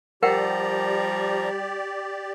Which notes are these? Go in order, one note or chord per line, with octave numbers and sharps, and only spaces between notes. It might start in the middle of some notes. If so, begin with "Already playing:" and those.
F3 G3 G4 A#4 D5 F#5 G5 A#5